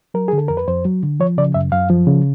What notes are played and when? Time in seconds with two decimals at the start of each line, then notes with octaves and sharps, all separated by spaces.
0.14 F#3 A#4
0.28 D3 G#4
0.38 A4
0.48 F2 A#4
0.57 B4
0.67 F2 C5
0.85 F#3
1.03 D3
1.20 F3 C#5
1.38 C#3 D5
1.54 F#2 E5
1.72 F#2 F5
1.89 F3
2.07 C#3